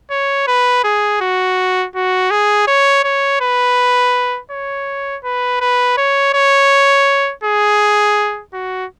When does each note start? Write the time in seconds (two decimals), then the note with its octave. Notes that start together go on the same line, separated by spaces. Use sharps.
0.11 C#5
0.48 B4
0.84 G#4
1.21 F#4
1.95 F#4
2.31 G#4
2.67 C#5
3.04 C#5
3.41 B4
4.51 C#5
5.24 B4
5.61 B4
5.98 C#5
6.34 C#5
7.44 G#4
8.54 F#4